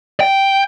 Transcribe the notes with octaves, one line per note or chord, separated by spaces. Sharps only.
G5